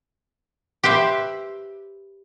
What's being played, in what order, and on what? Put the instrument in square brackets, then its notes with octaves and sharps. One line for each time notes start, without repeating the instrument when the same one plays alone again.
[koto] G4 B4 C5 E5